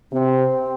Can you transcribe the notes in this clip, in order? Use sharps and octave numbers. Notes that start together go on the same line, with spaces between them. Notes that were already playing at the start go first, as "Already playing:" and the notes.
C3 C4